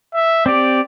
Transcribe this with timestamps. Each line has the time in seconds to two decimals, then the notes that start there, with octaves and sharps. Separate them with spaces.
0.14 E5
0.46 C4 G4 D5